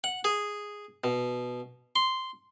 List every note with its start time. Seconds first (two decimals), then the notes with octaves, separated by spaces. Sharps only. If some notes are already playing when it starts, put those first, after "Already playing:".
0.04 F#5
0.24 G#4
1.04 B2
1.96 C6